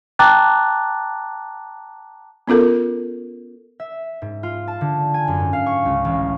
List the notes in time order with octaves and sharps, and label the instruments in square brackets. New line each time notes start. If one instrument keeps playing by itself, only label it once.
[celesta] G5 A5 A#5 D6 F#6 A6
[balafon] B3 C#4 F4 A4 A#4
[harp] E5
G#2
F4
A5
D3
G#5
F#2
G#2
F5
C#6
C#2
A1